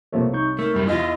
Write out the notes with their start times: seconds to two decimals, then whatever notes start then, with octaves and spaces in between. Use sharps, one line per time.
0.13 C2 C3 F3 A3 A#3 C#5
0.33 D#4 C#6 G6
0.59 A3 A#4
0.75 F#2 G3 A3
0.87 E2 F3 E4 F4 D#5